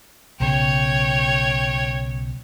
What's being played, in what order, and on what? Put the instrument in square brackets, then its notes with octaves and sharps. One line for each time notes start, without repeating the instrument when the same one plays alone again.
[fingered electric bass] B1 C#3 [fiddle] C#5 G5